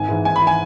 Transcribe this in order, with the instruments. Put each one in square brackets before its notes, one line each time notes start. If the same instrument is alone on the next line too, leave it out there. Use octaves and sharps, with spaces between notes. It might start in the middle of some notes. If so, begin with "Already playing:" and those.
Already playing: [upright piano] G#1 [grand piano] G#5
[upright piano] G#2 E3
[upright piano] G#1 [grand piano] G#5
[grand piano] B5
[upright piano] E3
[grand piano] G#5